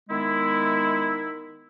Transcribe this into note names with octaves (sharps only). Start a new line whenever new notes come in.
D#3 G#3 B3 E4